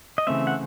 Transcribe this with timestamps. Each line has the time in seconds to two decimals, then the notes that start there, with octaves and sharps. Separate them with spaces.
0.18 D#5
0.27 C#3 E3 A3 C4 E5
0.47 F#5